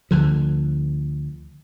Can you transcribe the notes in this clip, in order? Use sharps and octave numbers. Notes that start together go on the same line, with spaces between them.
D2 D3 F3